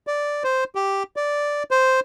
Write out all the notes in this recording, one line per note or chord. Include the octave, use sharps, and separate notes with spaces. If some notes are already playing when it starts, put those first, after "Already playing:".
D5
C5
G4
D5
C5